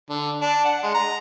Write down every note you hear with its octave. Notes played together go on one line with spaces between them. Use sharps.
D3
D4
F#5
G#3
A#5